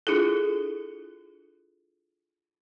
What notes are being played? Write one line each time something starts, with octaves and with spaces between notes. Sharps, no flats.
D4 E4 F4 G#4 A4